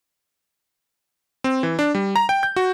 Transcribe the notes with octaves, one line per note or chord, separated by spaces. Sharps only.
C4
E3
D4
G3
A#5
G5
G6
F#4